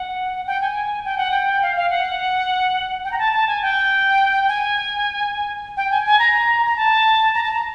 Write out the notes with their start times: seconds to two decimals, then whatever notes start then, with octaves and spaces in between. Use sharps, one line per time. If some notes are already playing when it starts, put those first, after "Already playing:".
Already playing: F#5
0.47 G5
0.61 G#5
1.05 G5
1.18 F#5
1.31 G5
1.62 F5
1.76 F5
1.90 F#5
3.04 G5
3.11 A#5
3.18 A5
3.33 A5
3.48 G#5
3.62 G5
4.48 G#5
5.77 G5
5.91 G#5
6.05 G#5
6.19 A#5
6.66 A#5
6.76 A5
7.34 A#5
7.43 A5
7.53 A#5